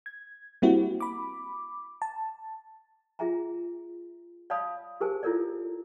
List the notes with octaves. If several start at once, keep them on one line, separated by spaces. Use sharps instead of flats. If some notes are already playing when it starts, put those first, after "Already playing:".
G#6
G3 A#3 C4 E4 F#4 G4
B5 D6
A5
F4 G#4 E5 G#5 A#5
C#5 D5 F5 A5 B5 D#6
G4 G#4 A#4 C5 G#5 A5
E4 F4 A4 A#4 C#5 D5